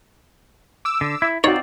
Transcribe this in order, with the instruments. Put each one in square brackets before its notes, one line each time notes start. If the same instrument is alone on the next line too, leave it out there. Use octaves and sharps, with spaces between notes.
[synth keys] D6 E6
[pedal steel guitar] D3
E4
[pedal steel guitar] C4 F4 D5 [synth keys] D#4 F#4 [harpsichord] C#5